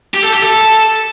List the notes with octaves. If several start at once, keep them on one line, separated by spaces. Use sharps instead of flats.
G4
A4
G4
A4